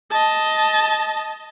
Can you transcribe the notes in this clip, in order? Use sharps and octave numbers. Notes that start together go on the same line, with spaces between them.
D#5 A5